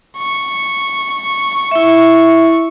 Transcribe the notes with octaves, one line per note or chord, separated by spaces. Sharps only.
C#6
E4 E5